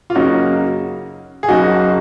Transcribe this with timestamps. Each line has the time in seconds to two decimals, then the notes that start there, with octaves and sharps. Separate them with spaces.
0.10 F4
0.15 F#2 C#3 F#3 A#3 C#4 D#4 F#4
1.43 G#4
1.48 F#1 F#2 C#3 D#4 F#4